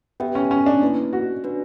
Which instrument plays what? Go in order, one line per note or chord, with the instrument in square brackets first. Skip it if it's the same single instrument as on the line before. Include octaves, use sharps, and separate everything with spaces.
[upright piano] B3 [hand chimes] G4 B4 E5 G5
[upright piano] C#4
C#4
D4
[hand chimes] A#3 E4 B4
[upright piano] F#4
[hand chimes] D4 F#4 B4